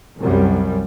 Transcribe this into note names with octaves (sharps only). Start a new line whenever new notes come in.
C2 F#2 G3